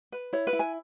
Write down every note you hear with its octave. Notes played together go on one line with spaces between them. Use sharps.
B4
E4 C#5
B4
E4
G#5